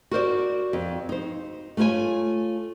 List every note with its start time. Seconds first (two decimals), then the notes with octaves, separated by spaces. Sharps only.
0.11 F#4 A#4 C5 D5
0.73 F2
1.09 D#4 C5
1.77 A3 F4 A#4 C#5 G#5